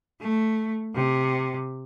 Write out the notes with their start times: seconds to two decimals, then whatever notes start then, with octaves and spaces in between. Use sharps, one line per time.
0.20 A3
0.94 C3